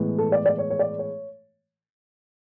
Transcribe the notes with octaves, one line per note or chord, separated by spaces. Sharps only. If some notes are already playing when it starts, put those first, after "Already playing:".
Already playing: A2 E3 G#3 B3
A4
D5
D5
C#5
C#5
D5
C#5